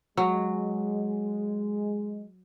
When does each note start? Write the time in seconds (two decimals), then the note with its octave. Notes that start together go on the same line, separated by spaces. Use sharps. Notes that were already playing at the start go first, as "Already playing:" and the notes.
0.17 F#3 G#3